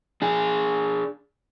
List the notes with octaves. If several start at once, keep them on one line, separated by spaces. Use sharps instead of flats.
D4 G#4